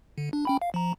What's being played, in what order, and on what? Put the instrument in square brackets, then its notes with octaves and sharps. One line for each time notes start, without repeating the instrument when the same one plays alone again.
[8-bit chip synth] D3
D4
C#4 G5 B5
F5
F3 A#5